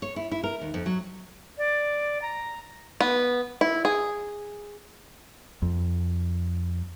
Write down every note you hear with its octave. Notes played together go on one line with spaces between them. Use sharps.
C#5
E4
E4
A#4
D#2
F2
F#3
D5
A#5
B3
E4
G#4
F2